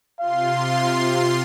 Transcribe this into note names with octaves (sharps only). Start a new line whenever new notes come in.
C3 F4 F5 C6